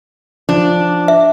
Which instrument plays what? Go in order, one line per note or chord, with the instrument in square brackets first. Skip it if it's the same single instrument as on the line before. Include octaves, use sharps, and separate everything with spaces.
[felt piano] F3 [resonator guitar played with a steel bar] D4
[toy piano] E5